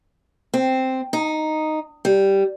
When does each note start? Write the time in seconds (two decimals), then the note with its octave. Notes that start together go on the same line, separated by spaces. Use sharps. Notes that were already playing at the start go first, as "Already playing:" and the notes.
0.54 C4
1.13 D#4
2.05 G3